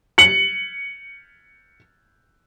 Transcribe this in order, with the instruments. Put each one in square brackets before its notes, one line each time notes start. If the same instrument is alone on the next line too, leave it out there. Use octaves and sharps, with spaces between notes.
[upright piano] C#7 F#7